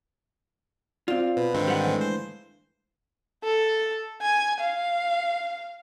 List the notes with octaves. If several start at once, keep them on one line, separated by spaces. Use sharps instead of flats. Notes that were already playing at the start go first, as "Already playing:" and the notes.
C4 F4 D5 F5
B2 B4
G#2 D3 D#3 C4 D4
G3 F#5
E3 G#3 A3
C5
A4
G#5
F5